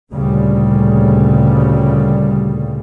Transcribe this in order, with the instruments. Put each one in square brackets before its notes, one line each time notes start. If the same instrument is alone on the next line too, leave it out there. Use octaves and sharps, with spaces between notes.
[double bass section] D2 A#2 C#3 G3